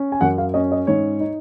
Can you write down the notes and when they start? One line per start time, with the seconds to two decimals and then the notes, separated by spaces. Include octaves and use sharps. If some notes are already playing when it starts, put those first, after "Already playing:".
Already playing: C#4
0.12 G#5
0.21 F#2 F#5
0.38 F5
0.54 C#4 D#5
0.72 D#5
0.87 G#2 C#5
1.20 D#4